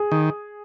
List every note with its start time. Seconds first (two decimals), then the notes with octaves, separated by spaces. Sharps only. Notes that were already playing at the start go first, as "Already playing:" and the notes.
Already playing: G#4
0.12 D#3